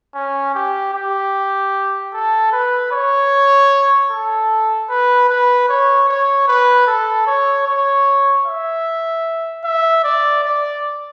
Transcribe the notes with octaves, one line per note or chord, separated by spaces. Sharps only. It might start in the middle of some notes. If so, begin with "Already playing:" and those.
C#4
G4
G4
A4
B4
C#5
A4
B4
B4
C#5
C#5
B4
A4
C#5
C#5
E5
E5
D5
D5